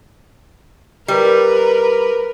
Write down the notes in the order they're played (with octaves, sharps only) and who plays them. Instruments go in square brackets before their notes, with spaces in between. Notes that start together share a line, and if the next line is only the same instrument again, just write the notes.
[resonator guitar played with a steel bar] G3 [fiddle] A#4 B4